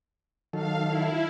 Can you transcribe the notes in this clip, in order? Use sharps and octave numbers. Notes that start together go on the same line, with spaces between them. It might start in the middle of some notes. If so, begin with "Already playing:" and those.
D#3 F#3 A4 F5
E4